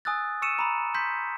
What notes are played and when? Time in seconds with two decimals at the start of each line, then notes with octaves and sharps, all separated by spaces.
0.05 G#5 D#6 E6 F#6 A6
0.42 C#6 E6 C#7 D#7 E7
0.59 A#5 B5
0.94 C6 G6 B6